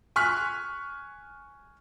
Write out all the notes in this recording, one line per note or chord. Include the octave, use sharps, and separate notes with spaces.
G#5 C#6 F6 F#6 B6